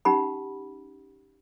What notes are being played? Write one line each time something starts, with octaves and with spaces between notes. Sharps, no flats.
C#4 D#4 G4 F#5 B5